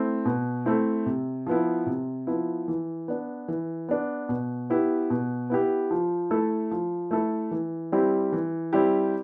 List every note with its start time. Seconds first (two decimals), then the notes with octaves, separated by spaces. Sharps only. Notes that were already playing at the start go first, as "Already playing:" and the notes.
Already playing: A3 C4 E4
0.25 B2
0.66 A3 C4 E4
1.06 C3
1.47 F3 B3 E4
1.86 C3
2.27 F3 B3 E4
2.68 E3
3.08 B3 D4
3.48 E3
3.89 B3 D4
4.29 B2
4.70 B3 E4 G4
5.10 B2
5.50 B3 E4 G4
5.91 F3
6.31 A3 E4 A4
6.71 F3
7.11 A3 E4 A4
7.51 E3
7.92 G3 C4 E4 G4
8.32 E3
8.73 G3 C4 E4 G4